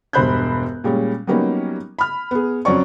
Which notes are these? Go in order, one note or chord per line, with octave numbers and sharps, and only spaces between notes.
E1 G2 C5 B5 F#6 G6
A#2 G3 G#3 C#4
F#3 G3 A#3 B3 C#4 D#4
B5 F6
B3 G#4
F2 F#3 C#4 D5 C#6